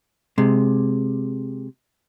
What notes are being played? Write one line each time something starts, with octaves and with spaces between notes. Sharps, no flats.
C3 G#3